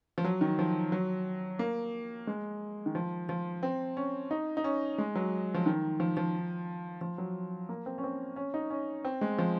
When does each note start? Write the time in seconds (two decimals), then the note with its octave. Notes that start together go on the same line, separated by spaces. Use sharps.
0.18 F3
0.24 F#3
0.41 D#3
0.59 F3
0.92 F#3
1.59 A#3
2.27 G#3
2.86 D#3
2.95 F3
3.29 F3
3.63 C4
3.97 C#4
4.31 D#4
4.57 D#4
4.64 C#4
4.98 G#3
5.15 F#3
5.54 F3
5.66 D#3
6.00 F3
6.17 F3
7.01 F3
7.18 F#3
7.69 A#3
7.86 C4
7.98 C#4
8.04 C4
8.36 C#4
8.54 D#4
8.70 C#4
9.05 C4
9.21 G#3
9.38 F3